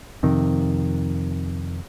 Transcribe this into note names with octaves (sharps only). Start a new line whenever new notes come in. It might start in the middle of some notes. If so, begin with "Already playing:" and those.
F2 C3 D#3